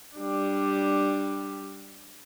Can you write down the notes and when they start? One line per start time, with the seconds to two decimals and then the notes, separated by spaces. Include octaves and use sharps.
0.17 G3 D4